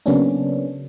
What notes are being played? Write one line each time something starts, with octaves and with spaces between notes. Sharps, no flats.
C#3 F#3 A#3 B3 C#4 D4